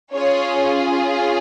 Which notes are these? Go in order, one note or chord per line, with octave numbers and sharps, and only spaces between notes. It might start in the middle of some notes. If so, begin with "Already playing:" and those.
C#4 F4 G#4 C#5